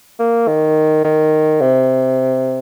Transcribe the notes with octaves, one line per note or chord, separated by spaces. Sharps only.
A#3
D#3
D#3
C3